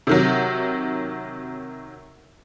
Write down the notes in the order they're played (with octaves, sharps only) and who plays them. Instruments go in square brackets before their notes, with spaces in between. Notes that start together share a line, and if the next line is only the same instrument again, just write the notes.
[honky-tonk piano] C3 D#3 F#3